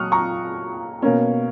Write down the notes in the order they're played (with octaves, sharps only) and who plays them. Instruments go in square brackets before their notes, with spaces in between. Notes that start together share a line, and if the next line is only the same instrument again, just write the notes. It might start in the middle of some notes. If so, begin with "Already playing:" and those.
Already playing: [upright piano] A#2 F#3 C#6 D#6 F6 F#6
A#5 C#6
B2 A#3 C#4